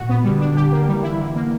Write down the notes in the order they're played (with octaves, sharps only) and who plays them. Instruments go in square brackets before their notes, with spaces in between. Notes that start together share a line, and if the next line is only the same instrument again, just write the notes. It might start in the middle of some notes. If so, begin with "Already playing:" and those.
Already playing: [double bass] A#2 [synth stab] F#4
[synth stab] B3
[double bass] D3 [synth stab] G3
[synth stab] D4
G4
A#3
[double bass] E3 [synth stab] G3
[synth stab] E4
D3
A#3